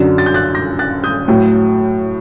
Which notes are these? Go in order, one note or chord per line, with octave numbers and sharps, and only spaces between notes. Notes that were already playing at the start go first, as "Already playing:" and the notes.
Already playing: F#2 D3 F#3
A6
G6
F#6 A6
G6 A#6
F#6 A6
D#6 G6
A2 F#3